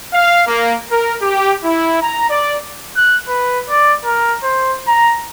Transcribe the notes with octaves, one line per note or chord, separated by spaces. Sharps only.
F5
A#3
A#4
G4
E4
A#5
D5
F#6
B4
D5
A#4
C5
A#5